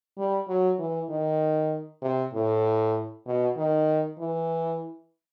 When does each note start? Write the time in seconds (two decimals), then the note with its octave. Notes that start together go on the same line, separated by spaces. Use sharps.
0.17 G3
0.48 F#3
0.79 E3
1.10 D#3
2.02 C3
2.33 A2
3.26 B2
3.57 D#3
4.19 E3